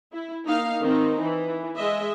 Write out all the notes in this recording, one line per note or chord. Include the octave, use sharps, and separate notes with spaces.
E4
A#3 D#4 F5
D#3 C4 D#4
E3
G#3 D#5 E5